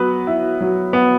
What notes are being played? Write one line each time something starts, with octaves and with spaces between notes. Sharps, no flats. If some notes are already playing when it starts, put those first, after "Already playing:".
Already playing: F#3 B3 B4
E4
F#3
B3